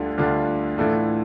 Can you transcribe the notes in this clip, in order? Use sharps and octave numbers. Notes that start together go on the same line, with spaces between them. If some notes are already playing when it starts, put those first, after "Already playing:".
Already playing: D2 D3 G3 D4 F4
D2 D3 G3 D4 F4
A2 E3 A3 D4 F4